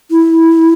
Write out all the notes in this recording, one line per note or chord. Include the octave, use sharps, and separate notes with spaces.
E4